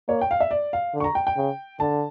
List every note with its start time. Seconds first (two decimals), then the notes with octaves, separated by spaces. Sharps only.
0.08 A#3 C#5
0.21 G5
0.31 F5
0.40 E5
0.51 D5
0.73 F5
0.94 D3
1.00 C#6
1.04 A#5
1.15 G5
1.27 G5
1.37 C#3
1.80 D3 A5